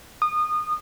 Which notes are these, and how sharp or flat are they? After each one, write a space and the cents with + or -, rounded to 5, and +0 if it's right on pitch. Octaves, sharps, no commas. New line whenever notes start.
D#6 -25